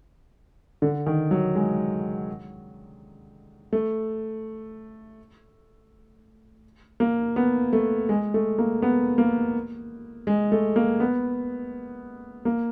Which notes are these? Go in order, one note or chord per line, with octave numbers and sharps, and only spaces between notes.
D3
D#3
F#3
G#3
A3
A#3
B3
A3
G#3
A3
A#3
B3
A#3
G#3
A3
A#3
B3
A#3